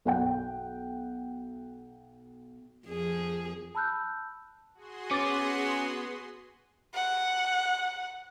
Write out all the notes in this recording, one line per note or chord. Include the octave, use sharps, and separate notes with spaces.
B1 F#5 G5
F2 G#4
A5 B5 E6 F#6 G6
F#4 G#4 C6
B3 C#4 D6 A6
F#5